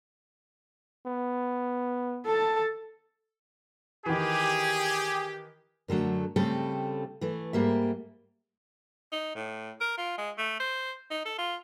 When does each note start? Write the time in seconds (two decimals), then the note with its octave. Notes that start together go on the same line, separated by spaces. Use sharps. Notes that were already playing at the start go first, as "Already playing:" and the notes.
1.06 B3
2.26 A4 A5
4.06 D#3 E3 G4 G#4
5.88 F#2 D3 F#3 A3
6.36 C#3 G3 A3 C4 A4
7.21 E3 A3
7.53 G#2 G3 A#3 E5
9.12 D#4
9.35 A2
9.81 A#4
9.98 F4
10.18 G#3
10.38 A3
10.60 C5
11.10 D#4
11.25 A4
11.38 F4